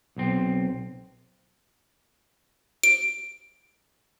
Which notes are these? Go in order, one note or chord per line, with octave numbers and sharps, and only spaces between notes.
B1 C4
D7